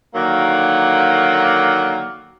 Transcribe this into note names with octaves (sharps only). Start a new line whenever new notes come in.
D3 D#3 F#3 A#3